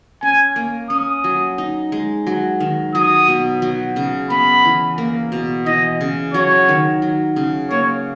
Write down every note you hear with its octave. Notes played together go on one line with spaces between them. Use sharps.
C#4 G#5
A#3
C#4 D#6
F#3
D#4
G#3
F#3
D#3
F#3 D#6
B2
F#3
C#3
B3 B5
E3
A#3
B2
E3 D#5
C#3
F#3 C#5
D#3
F#3
C#3
A#3 C#5